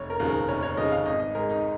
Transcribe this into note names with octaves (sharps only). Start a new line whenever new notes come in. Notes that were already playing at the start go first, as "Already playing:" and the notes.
Already playing: F1 C#5
A#4
D#2 C#3 F3
A#4
F1 C#5
C#5
D#2 C#3 F3 D#5
F5
G#1 D#5
D#5
G#2 G#3 A#4
D#4